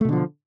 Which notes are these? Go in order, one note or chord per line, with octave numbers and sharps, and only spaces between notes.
B2 D3 F3 A3